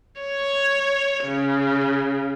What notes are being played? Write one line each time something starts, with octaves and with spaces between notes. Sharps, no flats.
C#5
C#3